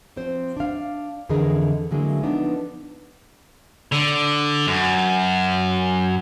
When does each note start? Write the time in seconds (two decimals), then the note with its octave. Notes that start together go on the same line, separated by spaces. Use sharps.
0.16 F3 C4 C5
0.56 D4 F5
1.29 F2 D3 E3 G#4 A#4 D#5
1.91 D3 F#3 G#3 A#3 E4
2.23 F3 B3 D4 D#4
3.92 D3
4.67 F#2